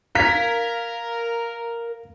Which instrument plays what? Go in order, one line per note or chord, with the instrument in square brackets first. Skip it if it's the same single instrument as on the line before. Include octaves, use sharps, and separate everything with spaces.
[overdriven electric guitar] A#4 [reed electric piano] F5 G#6 [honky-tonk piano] B6